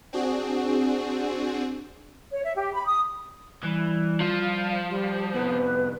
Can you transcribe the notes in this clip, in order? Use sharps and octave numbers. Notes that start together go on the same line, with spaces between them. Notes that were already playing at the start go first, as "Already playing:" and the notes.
C4 D4 F#4 G#4
C#5
E5
G4
B5
D#6
E3 G3
F3 F4
G3 G4
C2 F2 B3 B4